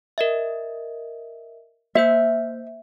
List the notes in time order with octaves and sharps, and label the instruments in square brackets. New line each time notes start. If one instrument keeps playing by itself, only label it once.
[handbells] A#4 D#5 E5
[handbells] A#3 C5 G6 [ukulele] E5